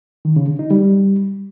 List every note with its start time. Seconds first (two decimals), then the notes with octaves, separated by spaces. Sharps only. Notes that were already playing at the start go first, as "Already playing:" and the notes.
0.25 D#3
0.36 C#3
0.48 D3
0.59 D#4
0.71 G3